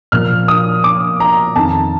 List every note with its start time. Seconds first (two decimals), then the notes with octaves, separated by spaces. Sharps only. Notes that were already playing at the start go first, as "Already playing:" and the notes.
0.12 A#2 F3 F6
0.48 D#6
0.84 D6
1.20 A#5
1.56 F2 D#3 A5